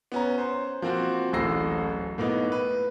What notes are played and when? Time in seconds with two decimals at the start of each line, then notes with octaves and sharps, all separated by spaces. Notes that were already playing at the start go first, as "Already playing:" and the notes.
0.12 B3 C#4 A#5
0.38 C5
0.82 F3 A#3 C4 F#4
1.33 D1 A1 A3 E6 A#6 C7
2.18 A2 A#3 B3 D#4
2.52 B4